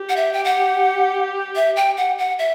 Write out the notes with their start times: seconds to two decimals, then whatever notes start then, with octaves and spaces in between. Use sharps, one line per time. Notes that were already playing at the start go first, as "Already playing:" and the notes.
Already playing: G4
0.09 F#5
0.16 E5
0.33 G5
0.45 F#5
1.56 E5
1.76 G5
1.97 F#5
2.18 F#5
2.39 E5